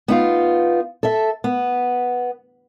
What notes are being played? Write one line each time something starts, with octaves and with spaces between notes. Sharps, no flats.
B3 D#4 F4
A4 E5
B3